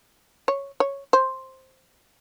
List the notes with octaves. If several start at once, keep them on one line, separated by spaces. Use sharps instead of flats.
C#5
C#5
C5